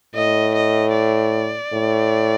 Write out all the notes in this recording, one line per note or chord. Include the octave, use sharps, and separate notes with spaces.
A2 D#5
D#5
D5
A2